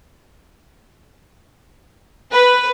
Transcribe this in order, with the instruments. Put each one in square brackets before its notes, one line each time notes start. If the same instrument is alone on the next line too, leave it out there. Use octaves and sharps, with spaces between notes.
[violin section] B4